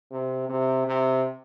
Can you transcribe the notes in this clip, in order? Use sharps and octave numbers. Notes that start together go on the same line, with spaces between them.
C3
C3
C3